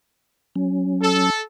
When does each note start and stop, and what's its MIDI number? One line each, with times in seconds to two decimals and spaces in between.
0.56 1.30 54
0.56 1.30 61
1.02 1.42 69